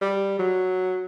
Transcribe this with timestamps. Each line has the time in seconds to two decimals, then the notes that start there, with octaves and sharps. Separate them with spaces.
0.01 G3
0.39 F#3